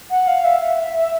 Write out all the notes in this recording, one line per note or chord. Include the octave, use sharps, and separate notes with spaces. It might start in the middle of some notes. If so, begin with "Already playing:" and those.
F#5
F5
E5